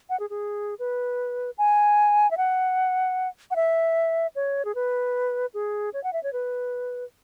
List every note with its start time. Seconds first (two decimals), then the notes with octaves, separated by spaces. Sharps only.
0.10 F#5
0.19 G#4
0.30 G#4
0.79 B4
1.58 G#5
2.31 E5
2.37 F#5
3.51 F#5
3.56 E5
4.35 C#5
4.65 G#4
4.75 B4
5.54 G#4
5.93 C#5
6.04 F#5
6.13 E5
6.23 C#5
6.33 B4